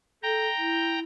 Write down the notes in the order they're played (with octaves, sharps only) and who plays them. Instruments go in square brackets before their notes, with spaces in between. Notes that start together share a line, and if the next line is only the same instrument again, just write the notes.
[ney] A4 [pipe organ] G5 A#5
[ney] E4